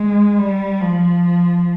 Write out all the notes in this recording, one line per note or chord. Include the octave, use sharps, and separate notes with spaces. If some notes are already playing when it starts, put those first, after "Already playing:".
Already playing: G#3
G3
F3